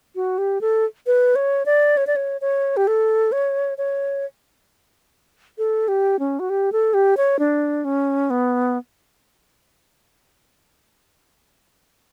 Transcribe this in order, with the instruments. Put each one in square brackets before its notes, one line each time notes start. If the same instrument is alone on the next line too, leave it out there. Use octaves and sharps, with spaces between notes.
[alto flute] F#4
G4
A4
B4
C#5
D5
C#5
D5
C#5
C#5
G4
A4
C#5
C#5
A4
G4
C#4
F#4
G4
A4
G4
C#5
D4
C#4
B3